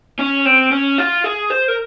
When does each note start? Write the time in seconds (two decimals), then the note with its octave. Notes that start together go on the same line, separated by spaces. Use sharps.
0.19 C#4
0.45 C4
0.71 C#4
0.98 F4
1.24 G#4
1.50 C5
1.68 A#4